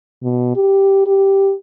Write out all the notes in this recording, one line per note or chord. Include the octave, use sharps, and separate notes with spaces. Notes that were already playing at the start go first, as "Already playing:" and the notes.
B2
G4
G4